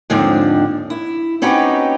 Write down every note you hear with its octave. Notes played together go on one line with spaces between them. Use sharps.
D#2 G#2 D3 F3 C4 D4
E4
C4 C#4 D#4 F#4 G4 B4